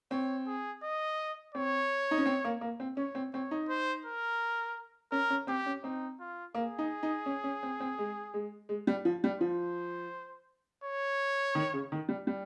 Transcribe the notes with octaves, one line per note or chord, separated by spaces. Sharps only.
C4 C#5
G#4
D#5
C4 C#5
D#4
C#4
C4
A#3
A#3
C4
C#4 C#5
C4
C4 C#5
D#4
C5
A#4
C#4 A#4
C#4
C4 G4
C#4
C4 D#4
F4
A#3 G#4
D#4
D#4
C#4
C#4
C4
C4
G#3
G#3
G#3
G3
F3
G3
F3 C5
C#5
D#3
C#3
D#3
G3
G3